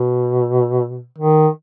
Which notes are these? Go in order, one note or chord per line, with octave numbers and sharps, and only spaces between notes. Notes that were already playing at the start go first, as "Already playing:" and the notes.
Already playing: B2
D#3